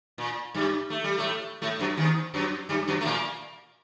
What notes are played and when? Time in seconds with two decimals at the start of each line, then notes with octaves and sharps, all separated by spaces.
0.18 A#2
0.54 G2 G3
0.90 A3
1.04 G3
1.17 A2 A3
1.62 A2 A3
1.80 F#2 F#3
1.97 D#2 D#3
2.34 F#2 F#3
2.69 G2 G3
2.88 F#2 F#3
3.01 A3
3.05 A#2 A#3